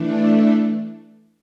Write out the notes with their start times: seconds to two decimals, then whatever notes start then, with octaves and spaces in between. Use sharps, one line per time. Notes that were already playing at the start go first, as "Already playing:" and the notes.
Already playing: E3 A3 D4